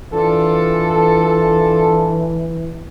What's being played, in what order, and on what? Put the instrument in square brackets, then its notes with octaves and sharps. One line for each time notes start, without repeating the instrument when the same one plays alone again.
[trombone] E3 [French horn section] D4 F4 A4